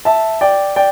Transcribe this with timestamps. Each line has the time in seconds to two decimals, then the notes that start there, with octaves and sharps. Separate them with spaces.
0.05 E5 A5
0.41 D5 G5
0.76 D5 G5